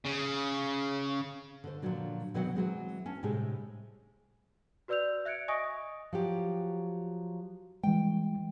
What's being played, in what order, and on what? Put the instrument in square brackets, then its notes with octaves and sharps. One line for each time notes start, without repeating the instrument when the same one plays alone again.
[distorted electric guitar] C#3
[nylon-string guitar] D3 C5
A#2 D3 D#3 F3 F#3 D4
B2 D#3 F#3 C4 F#4 F#5
E3 F#3 G#3 C4
C#4 A5
A2 C3 G#3 G4 G#4
[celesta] F#4 B4 D5 E6 G6 F7
E5 F#6 G#6 C#7 D7
D#5 G#5 C#6 D#6 A#6 D7
[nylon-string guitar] F3 F#3 G4
[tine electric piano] E3 G3 G#3 [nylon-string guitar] G5